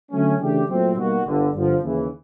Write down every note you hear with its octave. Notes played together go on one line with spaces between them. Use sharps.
D3 F#3 A3 C#4
C#3 E3 A3 D4 G4
A#2 F#3 A3 C4
B2 G3 A#3 D#4 F#4
G1 G2 D3
G1 G2 D3 F3
D#2 C#3 E3